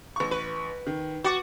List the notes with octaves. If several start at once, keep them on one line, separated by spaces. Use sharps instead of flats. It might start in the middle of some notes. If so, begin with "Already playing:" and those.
A1 C#6
B4
D#3
F#4 D6 A6 C#7